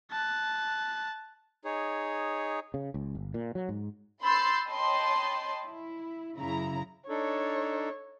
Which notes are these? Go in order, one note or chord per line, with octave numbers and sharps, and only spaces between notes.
A5 F#6
D#4 G#4 C#5
C#3
C#2
G1
A#2
F#3
G#2
B5 C6 E6 G6 A6 C7
C#5 D#5 G5 A5 B5 C6
E4
F#2 C#3 E4 A#5
D4 D#4 A4 C#5